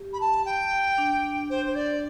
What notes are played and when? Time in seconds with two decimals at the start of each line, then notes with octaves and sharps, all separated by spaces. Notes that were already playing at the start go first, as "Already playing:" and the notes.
Already playing: G4
0.13 B5
0.21 A5
0.46 G5
0.98 D4
1.50 C5
1.66 C5
1.75 D5